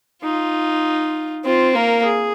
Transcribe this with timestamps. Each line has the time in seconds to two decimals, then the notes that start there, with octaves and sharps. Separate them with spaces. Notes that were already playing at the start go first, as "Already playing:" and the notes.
0.23 D#4 F4
1.45 C4 F4
1.75 A#3 A#4
2.04 G#4